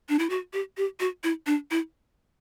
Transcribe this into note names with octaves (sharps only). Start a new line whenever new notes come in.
D4
E4
F#4
G4
G4
F#4
E4
D4
E4